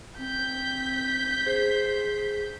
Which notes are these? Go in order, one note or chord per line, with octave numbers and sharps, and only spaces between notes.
C4 G6 B6
G#4 C5